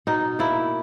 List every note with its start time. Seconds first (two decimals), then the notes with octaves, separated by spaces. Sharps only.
0.07 B2 D#4
0.39 A#3 E4